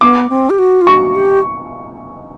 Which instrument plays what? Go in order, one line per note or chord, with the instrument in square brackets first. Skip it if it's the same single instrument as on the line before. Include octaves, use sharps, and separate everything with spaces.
[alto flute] B3 [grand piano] D6
[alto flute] C4
G4
F#4
F4
[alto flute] F#4 [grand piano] C#6
[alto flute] G4